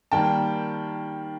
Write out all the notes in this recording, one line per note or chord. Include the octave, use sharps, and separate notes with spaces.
D#3 G3 A#3 G5 A5